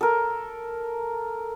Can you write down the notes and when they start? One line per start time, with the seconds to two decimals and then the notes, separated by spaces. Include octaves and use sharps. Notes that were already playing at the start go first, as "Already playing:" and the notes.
0.01 A4 A#4